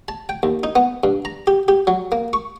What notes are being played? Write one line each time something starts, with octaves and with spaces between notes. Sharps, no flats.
A5
G5
D#2
D#4
B3
G2
A#5
G4
G4
F#3
A#3
C#6